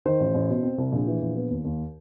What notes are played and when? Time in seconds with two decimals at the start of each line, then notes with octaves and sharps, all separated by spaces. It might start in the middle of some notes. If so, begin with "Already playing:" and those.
0.05 D#3 C5
0.20 A1
0.34 A1
0.49 B2
0.63 C4
0.78 C2
0.92 A#1
1.07 E3
1.22 A#1
1.36 B3
1.50 D#2
1.65 D#2